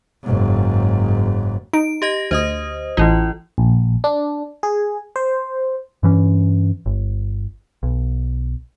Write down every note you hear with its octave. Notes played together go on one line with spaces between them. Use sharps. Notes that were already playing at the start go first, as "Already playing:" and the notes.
F#1 G#2
D#4 D7
G4 D#5 A#6
D2 C5 D#5 D#6
A1 E3 E4 F4 D#5
A#1
D4
G#4
C5
G2 E3 C#4
G1
B1